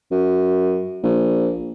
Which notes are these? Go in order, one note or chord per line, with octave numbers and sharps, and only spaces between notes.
F#2
A#1